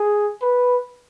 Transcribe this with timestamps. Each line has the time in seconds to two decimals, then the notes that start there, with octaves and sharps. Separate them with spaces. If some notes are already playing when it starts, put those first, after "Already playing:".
Already playing: G#4
0.42 B4